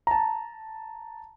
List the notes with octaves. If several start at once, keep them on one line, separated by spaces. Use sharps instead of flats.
A5 A#5